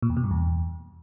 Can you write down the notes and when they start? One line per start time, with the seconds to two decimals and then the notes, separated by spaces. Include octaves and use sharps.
0.02 A#2
0.10 E2
0.17 B2
0.24 G2
0.31 E2